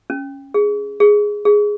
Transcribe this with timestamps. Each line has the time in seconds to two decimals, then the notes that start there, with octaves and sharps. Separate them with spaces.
0.10 C#4
0.54 G#4
1.00 G#4
1.45 G#4